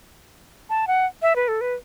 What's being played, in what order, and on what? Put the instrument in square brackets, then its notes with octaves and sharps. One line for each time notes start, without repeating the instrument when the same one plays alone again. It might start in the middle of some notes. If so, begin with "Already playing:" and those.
[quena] A5
F#5
E5
B4
A4
B4